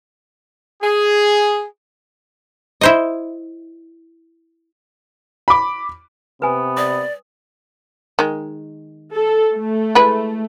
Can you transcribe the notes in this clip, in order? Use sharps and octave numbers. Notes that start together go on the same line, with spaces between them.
G#4
E4 C5 D#5
B5 D6
C3 B3 B4 G#5
D5 D#6
D#3 G#3
A4
A3
G#3 E4 B4